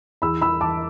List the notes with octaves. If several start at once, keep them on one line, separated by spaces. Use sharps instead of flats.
E2 B5 E6
E2 B5 E6
E2 A5 D6